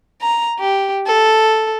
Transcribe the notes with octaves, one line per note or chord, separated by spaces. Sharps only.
A#5
G4
A4